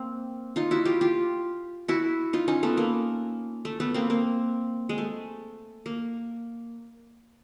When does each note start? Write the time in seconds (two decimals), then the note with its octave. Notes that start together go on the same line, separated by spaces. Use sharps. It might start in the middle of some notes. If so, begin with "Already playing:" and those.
Already playing: A#3 C4
0.56 D#4 F4
0.71 E4 F#4
0.85 F4 G4
1.01 F4 G4
1.88 E4 F#4
2.33 D#4 F4
2.48 C#4 D#4
2.63 A3 B3
2.77 A#3
3.65 A3
3.80 A3 B3
3.94 A#3 C4
4.10 A#3
4.89 G#3
4.98 A3
5.86 A#3